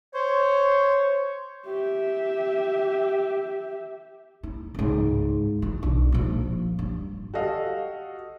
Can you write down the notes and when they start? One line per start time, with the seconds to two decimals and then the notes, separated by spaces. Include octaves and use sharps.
0.14 C5 C#5
1.66 G4 E5
4.43 E4
4.75 C#2 G#2
5.62 E3
5.83 B1 D4
6.12 A#2 F3
6.79 G2
7.34 F#4 G4 A4 D#5 F5